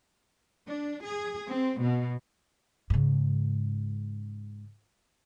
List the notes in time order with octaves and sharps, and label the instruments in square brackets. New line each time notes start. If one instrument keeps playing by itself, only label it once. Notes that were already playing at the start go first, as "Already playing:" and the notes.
[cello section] D4
G#4
C4
B2
[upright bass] G#2 C#3